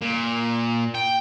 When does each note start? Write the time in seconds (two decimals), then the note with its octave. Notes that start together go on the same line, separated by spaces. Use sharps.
0.02 A#2
0.95 G5